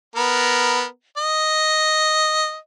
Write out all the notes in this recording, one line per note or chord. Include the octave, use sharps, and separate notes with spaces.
B3 A#4
D#5